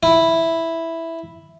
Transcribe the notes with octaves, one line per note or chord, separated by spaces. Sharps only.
E4